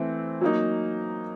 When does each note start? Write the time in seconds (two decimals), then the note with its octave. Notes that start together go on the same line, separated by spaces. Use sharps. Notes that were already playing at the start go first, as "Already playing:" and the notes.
Already playing: E3 A3 C4
0.41 F#3 A#3 D#4